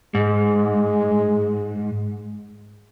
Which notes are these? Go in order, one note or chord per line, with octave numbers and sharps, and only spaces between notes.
G#2 G#3